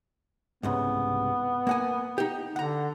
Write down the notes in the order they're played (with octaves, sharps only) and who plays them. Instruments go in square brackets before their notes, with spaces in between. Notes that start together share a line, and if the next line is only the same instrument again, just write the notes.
[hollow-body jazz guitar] C2 G#2 C#3 [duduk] B3
[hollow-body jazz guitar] A#3 F#5 G#5
D#4 G4
[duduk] D3 [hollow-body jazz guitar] F#5 A#5